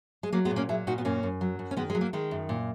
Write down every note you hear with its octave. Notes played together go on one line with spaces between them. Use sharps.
G#3
F#3 A#3
G#3 B3
A#2
A#3 C#4
F#3 E4 G#4
A#2 D#4 F#4
B3
F#2 A#3 C#4
F#2
F#3
F#2
C#4
D#3 G#3 B3
G#3
F#3
A#3
D#3 G#3
F#2
A#2